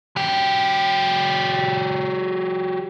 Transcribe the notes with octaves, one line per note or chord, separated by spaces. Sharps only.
F#3 G4